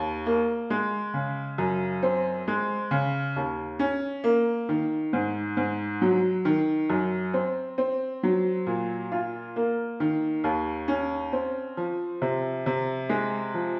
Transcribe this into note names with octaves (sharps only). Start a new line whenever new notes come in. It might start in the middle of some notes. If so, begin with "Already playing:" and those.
Already playing: D#2
A#3
G#3
C#3
F#2
C4
G#3
C#3
D#2
C#4
A#3
D#3
G#2
G#2
F#3
D#3
F#2
C4
C4
F#3
A#2
F4
A#3
D#3
D#2
C#4
C4
F3
C3
C3
G#3
F3